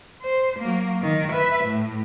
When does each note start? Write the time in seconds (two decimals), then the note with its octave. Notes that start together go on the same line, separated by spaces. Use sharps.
0.22 C5
0.60 F#3 A#3
1.02 D#3
1.32 B4 E5
1.65 A2